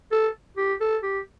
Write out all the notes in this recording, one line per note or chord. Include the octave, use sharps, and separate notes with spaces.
A4
G4
A4
G4